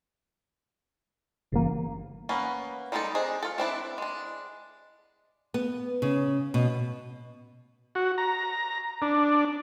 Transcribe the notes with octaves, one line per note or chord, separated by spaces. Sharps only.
G1 C#3 E3 A#3
A#3 B3 C#4 B4
G3 G#3 D#4 G#4 A4
C4 D4 G#4 D#5
F4 A4
C4 D4 E4 B4
G#3 D4
B3
C#3
B2
F#4
A#5
D4